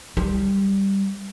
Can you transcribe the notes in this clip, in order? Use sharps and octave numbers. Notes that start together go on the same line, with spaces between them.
G3